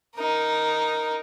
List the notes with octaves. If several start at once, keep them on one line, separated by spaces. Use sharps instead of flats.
D#4 A#4